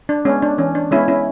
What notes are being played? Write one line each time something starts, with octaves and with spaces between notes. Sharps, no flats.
D4
G#3 B3 C#4
D4
E3 C#4
D4
G#3 B3 C#4 E4
C#4 E4